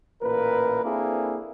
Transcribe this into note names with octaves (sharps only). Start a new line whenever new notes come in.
A1 A#2 A#3 A#4 B4
A#3 C4 D4 E4 G#4 A4